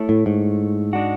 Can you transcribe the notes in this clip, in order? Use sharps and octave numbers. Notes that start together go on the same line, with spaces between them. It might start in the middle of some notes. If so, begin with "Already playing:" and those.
Already playing: A3 E4 A4 C#5
A2
G#2
G#3 D4 F#4